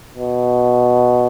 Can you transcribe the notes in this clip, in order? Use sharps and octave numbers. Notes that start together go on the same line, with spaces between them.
B2